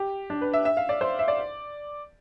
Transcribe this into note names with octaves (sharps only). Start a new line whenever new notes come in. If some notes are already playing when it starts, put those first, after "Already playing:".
Already playing: G4
D4
B4
E5
E5
F5
D5
C5
E5
D5